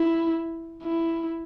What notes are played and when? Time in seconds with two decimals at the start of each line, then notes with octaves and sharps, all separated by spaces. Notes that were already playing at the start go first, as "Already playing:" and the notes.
Already playing: E4
0.83 E4